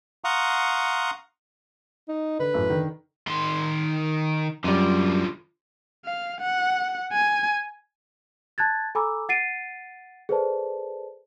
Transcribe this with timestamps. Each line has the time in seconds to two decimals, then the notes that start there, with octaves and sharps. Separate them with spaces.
0.24 F5 F#5 A#5 C6 C#6 D#6
2.08 D#4
2.39 D3 B4
2.54 A1 F#2 A4
2.69 D3 D#3
3.27 D#3 C6
4.64 F#2 D3 G3 F4
6.05 F5
6.41 F#5
7.13 G#5
8.58 A5 F#6 G#6 A6
8.95 A4 G#5 A#5 B5 D6 E6
9.29 F#5 A6 C7 D7 D#7
10.29 G#4 A4 B4 C5 D5 A5